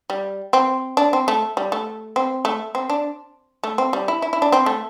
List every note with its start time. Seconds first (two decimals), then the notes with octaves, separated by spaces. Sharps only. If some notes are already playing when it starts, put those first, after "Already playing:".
0.10 G3
0.53 C4
0.97 D4
1.13 C4
1.28 A3
1.57 G3
1.72 A3
2.16 C4
2.45 A3
2.75 C4
2.90 D4
3.64 A3
3.78 C4
3.93 G3
4.08 E4
4.22 E4
4.33 E4
4.42 D4
4.52 C4
4.66 A3